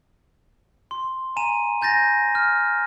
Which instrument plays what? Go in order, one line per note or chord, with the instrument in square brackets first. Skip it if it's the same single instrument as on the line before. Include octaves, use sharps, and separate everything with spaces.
[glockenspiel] C6
G#5 A#5 D#7 E7
G#5 G6 A6 A#6
F6